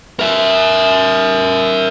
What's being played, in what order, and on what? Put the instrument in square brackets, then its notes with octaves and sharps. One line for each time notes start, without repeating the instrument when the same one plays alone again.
[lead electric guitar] A#4 E5